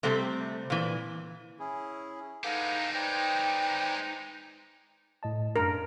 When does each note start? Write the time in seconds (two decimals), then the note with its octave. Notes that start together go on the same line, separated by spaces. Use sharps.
0.03 C3 G3 A3 C4
0.70 A#2 E3
1.60 C#4 E4 G#4
2.44 G#3 D#4 G4 A4 B4 F5 F#5
2.94 B4 C5 D5 G5
5.23 A2 D#5 A5
5.56 F#2 D4 A#4